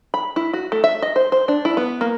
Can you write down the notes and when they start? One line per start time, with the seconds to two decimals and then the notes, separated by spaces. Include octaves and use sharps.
0.14 B5
0.36 E4
0.53 F#4
0.72 A3
0.84 E5
1.02 D#5
1.16 C5
1.32 C5
1.48 D4
1.65 E4
1.77 B3
2.01 A#3